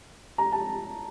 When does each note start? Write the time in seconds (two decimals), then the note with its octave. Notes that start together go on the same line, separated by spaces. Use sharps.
0.38 A#5
0.52 A5